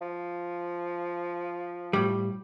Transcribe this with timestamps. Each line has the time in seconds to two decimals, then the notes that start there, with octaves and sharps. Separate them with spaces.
0.02 F3
1.93 A2 G3